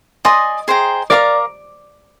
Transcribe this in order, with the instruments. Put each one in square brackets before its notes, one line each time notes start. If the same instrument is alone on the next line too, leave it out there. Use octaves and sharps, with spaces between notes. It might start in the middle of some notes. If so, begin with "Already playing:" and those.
[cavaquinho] D5 G#5 C6 D#6 [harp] D#5
[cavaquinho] G#4 C5 G5 A#5
[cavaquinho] A#4 F5 A#5 D6 [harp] D5